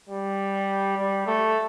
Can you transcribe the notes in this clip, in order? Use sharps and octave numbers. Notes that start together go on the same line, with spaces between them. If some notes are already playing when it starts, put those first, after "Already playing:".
G3
G3
A3